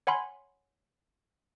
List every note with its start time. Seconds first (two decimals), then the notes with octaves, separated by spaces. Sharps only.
0.07 C#5 F#5 G#5 B5 C6